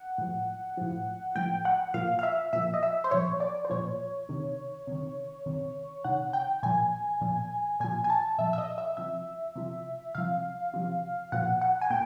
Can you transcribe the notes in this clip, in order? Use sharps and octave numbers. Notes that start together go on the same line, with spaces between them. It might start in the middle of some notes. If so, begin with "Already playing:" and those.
Already playing: F#5
A2 F3
A2 F3
A2 F3 G5
F#5
A#2 F3 F5
F5
E5
A#2 F3 E5
D#5
E5
C5
A#2 F3 C#5
D5
C5
A#2 F3 C#5
C3 D#3
C3 D#3
C3 D#3
C3 D#3 F#5
G5
A#2 F3 G#5
A#2 F3
A#2 F3 G#5
G#5
A5
A#2 F3 E5
E5
D#5
E5
C3 F3 E5
C3 F3
C3 F3 F5
C3 F3
A#2 F3 F#5
F#5
G#5
A#2 G5